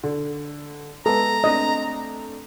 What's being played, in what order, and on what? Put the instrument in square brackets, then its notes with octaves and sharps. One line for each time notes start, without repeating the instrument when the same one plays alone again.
[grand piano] D3
[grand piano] G#3 B3 [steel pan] A4 [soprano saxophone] A#5
[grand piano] A3 C4 D4 [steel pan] D#5